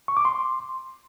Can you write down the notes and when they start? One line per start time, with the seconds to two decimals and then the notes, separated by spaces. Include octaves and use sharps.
0.08 C#6
0.17 D6
0.25 C6